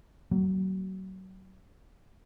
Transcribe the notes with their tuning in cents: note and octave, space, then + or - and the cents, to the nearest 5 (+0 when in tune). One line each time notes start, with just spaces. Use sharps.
F#3 +30 A#3 -20